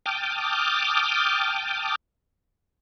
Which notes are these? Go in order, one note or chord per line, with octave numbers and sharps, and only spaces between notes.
G5 A5 D6 D#6 F6